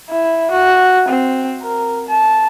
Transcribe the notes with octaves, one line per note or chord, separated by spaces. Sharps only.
E4
F#4
C4
A#4
A5